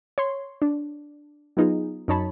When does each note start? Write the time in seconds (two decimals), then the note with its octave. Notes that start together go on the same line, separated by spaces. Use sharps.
0.18 C#5 C6
0.62 D4
1.57 F#3 B3 D#4 F4 G#4
2.08 F#2 D#4 C#5 A5 B5